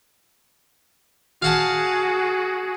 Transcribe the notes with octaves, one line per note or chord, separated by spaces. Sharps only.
F#4 G#4 F5 F#5 A5